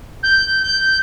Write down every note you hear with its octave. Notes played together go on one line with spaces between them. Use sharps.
G6
G6